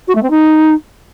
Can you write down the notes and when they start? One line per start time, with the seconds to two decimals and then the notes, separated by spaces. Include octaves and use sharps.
0.07 F#4
0.15 A3
0.23 C4
0.30 D#4